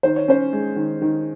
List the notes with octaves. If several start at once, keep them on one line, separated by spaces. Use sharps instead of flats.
D#3 C5
C#5
C#4 C5
G#3
D#3
D#3